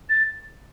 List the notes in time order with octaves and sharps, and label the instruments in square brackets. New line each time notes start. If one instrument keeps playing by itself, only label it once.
[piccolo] A6